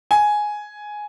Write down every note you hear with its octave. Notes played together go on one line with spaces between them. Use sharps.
G#5